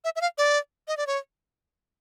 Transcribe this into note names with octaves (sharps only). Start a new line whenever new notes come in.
E5
E5
F5
D5
D#5
D5
C#5